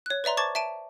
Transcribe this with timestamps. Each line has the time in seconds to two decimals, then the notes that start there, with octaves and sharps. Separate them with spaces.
0.06 C#5 F#6
0.24 B4 D5 E5 A#5 C6
0.37 C5 A5 C#6 D6 G#6 A6
0.55 E5 A5 D7 D#7